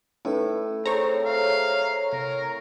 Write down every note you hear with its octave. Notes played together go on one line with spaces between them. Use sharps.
A2 C#4 D#4 B4
C4 G#4 A4 C5 C#5 A#5
F5
C3 A#4